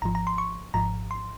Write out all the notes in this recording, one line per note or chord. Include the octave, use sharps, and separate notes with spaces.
G#1 G#2 F3 A#5
A#5
C6
C#6
G#1 G#2 F3 A#5
C6